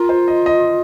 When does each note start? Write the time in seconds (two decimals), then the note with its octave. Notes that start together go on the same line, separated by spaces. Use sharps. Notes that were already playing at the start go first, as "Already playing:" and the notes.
Already playing: F4 A#4
0.09 C5
0.28 D#5
0.46 D#5